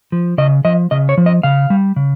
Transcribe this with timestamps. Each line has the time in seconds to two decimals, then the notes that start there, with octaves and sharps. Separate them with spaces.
0.12 F3
0.38 C#3 D#5
0.65 F3 D#5
0.91 C#3 D#5
1.09 C#5
1.18 F3
1.26 D#5
1.43 C#3 F5
1.70 G3
1.96 C#3